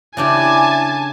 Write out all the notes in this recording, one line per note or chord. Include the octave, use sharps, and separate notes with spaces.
C#3 D4 E4 G4 G#5 A5